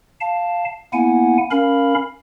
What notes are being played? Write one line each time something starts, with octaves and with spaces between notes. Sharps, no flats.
F5 A5
A#3 B3 E4 F#5 G#5
C#4 A#4 F5 B5